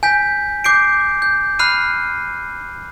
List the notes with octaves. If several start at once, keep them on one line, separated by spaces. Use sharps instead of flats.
G#5 G6 B6
D6 G6 C7 D7
G6
B5 F6 F#6 C7 D#7